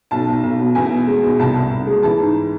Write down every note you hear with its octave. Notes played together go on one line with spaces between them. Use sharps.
B1 A5
B1
B1
B2
E2 G#5
B2
G#3
B2
C2 A5
C2
C2
G#3
E3 A5
G#2